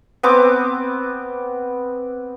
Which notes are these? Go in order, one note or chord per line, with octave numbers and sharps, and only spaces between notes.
B3 C4 D6